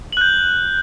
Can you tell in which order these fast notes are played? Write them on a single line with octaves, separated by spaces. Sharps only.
F#7 F#6 G6